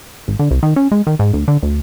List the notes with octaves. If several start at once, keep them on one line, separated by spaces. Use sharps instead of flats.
G#1
D3
C2
D#3
C#4
G#3
D#3
G#2
D2
D3
D2